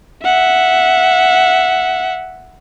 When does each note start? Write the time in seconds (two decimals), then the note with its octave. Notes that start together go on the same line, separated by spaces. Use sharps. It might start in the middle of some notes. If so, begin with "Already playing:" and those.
0.24 E5 F#5